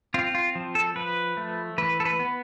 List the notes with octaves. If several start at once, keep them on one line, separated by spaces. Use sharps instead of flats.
C4 F4
F4
F3
A4
F3 B4
A3
E3 B4
A4
B4
B3